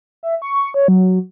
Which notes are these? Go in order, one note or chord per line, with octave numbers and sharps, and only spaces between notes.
E5
C#6
C#5
F#3